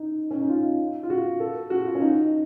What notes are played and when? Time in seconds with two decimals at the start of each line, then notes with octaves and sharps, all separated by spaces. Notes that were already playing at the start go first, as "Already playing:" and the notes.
Already playing: D#4
0.31 C#4
0.40 D#4
0.49 F4
1.03 F4
1.10 F#4
1.40 A4
1.70 F#4
1.85 F4
1.95 C#4
2.00 D#4